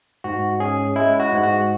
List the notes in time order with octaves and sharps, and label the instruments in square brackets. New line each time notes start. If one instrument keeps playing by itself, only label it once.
[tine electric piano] G#2 F#4
C#4 G#4
G#3 E4
F#4
G#2
F#4